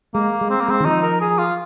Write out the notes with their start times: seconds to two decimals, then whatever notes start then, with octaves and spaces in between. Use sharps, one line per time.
0.14 G#3 A#3
0.41 G#3
0.50 C4
0.61 A#3
0.68 G#3 C4
0.80 D#3
0.85 F3 D#4
1.03 A#4
1.21 G#4
1.38 F4